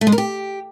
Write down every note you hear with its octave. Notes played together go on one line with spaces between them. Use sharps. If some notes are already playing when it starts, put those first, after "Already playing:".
A3
G#3
A#4
G4